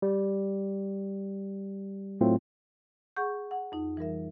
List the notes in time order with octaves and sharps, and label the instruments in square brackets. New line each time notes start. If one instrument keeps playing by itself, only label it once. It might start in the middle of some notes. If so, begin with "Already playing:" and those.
[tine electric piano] G3
A2 F#3 A3 C4 F4
[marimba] G#4 F#5 C#6 G6
F#5
F2 D#4
E3 G3 A#4 E5